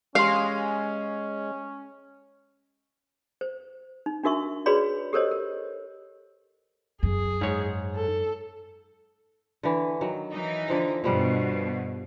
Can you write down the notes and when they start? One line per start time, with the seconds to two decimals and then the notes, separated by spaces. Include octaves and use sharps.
0.15 G#3 C#4 G4 F5 C6
3.41 C5
4.06 D#4
4.23 D4 D#4 F#4 A#4 E5 C#6
4.66 F#4 G#4 B4 C#5 D5 B5
5.13 G4 A4 A#4 C5 C#5 D#5
5.31 A#4
7.03 F#2 G#4
7.41 G#2 C#5
7.95 A4
9.63 D3 E3
10.01 D#3 F#3
10.31 E3 D#4
10.68 D3 F3 F5
11.04 G2 B2 F3 G3 F#5